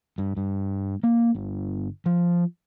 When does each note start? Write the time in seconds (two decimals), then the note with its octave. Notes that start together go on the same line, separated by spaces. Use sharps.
0.18 G2
0.37 G2
1.03 A#3
1.35 G1
2.06 F3